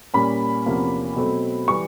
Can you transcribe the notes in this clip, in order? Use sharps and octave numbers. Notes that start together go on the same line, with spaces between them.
A#2 G3 A#3 C#4 B5
E2 C3 F3 A#3 C#4
B2 F#3 A3 C4
E3 G3 C#6